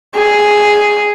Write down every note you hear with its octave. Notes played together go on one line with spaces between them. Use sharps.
G#4